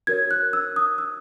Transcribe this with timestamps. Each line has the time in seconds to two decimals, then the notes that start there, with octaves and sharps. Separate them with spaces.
0.07 F#4 A#4 C#5 G#6
0.31 F#6
0.53 E6
0.76 D#6
0.98 E6